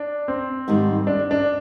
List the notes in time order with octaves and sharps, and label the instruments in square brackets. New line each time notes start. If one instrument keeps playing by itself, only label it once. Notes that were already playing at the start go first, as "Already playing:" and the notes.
Already playing: [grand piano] D4
C4
[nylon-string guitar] G#2 D#3 G3
[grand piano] D4
D4